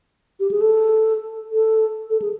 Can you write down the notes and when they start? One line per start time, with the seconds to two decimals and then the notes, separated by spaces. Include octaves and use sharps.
0.40 G4
0.51 G#4
0.61 A4
1.52 A4
2.10 A4
2.22 G#4